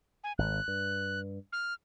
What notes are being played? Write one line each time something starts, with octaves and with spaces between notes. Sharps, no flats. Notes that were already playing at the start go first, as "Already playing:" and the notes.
G#5
G#1 F#6
G2
F6